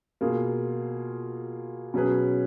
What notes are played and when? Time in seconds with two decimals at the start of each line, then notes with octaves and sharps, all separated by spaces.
0.21 B2 A#3 F4 G#4
1.94 B2 F#3 C#4 G#4 B4